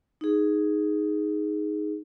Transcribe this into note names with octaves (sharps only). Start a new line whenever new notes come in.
D#4 G#4